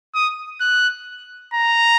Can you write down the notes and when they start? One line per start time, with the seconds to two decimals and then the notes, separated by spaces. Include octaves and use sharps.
0.15 D#6
0.61 F#6
1.54 A#5